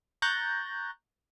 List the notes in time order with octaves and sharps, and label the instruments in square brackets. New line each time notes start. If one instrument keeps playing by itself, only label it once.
[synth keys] A#5 C#6 F#6 G6 A6 A#6